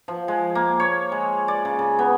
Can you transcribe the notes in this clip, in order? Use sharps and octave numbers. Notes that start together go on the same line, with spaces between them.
F3
G#3
A#3
C#5
G#3
D5
C#3
C#3
B3